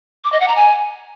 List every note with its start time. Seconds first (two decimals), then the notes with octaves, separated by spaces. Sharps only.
0.24 D6
0.32 D#5
0.40 F#5
0.48 A#5
0.56 G#5